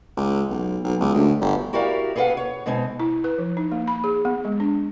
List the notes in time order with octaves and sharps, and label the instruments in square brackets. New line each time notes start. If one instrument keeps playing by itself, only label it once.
[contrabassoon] C#2
B1
B1
C#2
D2
G1
[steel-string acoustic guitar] E4 F#4 G4 A#4 D5 F5
G#4 A4 B4 C#5 F5 F#5
C#5
B2 G#3 C4 D#4
[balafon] E4
B4
F3
D#4
A#3
B5
G#4
B3
G#3
D4